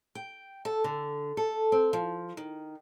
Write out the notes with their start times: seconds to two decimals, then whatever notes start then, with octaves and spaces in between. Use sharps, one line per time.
0.15 G5
0.65 A4
0.84 D3
1.37 A4
1.72 C4
1.93 F3
2.37 D#3